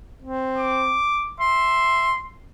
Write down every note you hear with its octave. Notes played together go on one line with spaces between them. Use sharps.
C4
D6
E5 C6